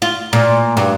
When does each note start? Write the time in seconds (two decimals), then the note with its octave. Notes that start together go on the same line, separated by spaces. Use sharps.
0.02 F4
0.33 A#2
0.77 G2